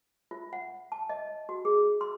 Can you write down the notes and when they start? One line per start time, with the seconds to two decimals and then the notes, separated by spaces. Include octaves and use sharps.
0.31 F4
0.53 F#5
0.92 A5
1.10 D#5
1.49 F#4
1.65 G#4
2.01 C6